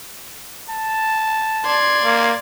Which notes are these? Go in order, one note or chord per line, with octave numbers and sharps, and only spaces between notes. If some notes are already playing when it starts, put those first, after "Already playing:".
A5
D5 C6 G#6
A#3